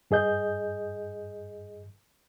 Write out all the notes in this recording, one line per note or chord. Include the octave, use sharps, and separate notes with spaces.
G2 G#4 D#5 G6